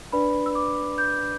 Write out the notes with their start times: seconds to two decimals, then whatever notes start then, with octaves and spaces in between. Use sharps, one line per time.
0.12 D4 B4 D5 B5
0.46 E6
0.55 D6
0.98 G6